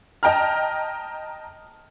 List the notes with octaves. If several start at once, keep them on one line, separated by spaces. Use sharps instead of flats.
D#5 G5 A5 A#5 F6